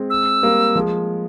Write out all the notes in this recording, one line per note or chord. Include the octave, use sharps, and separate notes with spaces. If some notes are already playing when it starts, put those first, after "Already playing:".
Already playing: G#3 C4
E6
G3 A#3
F3 G#3